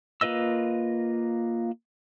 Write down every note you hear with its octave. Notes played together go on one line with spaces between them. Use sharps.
A#3 F4 B4 D#5 E6